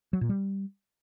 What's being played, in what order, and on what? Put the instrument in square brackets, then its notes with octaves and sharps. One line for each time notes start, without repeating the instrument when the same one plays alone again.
[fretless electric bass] F#3
A#2
G3